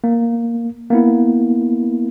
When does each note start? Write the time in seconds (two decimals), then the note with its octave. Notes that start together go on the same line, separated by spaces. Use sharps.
0.04 A#3
0.91 A#3 B3 E4